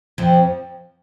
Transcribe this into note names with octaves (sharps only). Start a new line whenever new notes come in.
F2 F3